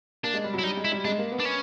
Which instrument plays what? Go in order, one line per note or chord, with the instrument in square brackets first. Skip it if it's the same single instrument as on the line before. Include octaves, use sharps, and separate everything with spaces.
[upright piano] A#3 [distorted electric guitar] D4
[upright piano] G#3
G3
F#3
[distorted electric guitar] E4
[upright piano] G3 [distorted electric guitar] D#4
[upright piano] G#3
[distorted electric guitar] E4
[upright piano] G3
[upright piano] G#3 [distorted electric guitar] D4
[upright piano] A#3
B3
[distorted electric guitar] D4
C#4